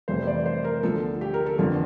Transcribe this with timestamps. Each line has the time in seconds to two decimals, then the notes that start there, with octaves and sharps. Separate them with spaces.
0.08 F1 F2 E3 G3 C5
0.27 D5
0.46 C5
0.64 A#4
0.83 D2 D3 F3 A4
1.21 G4
1.34 A#4
1.46 A4
1.58 G1 F2 D3 F4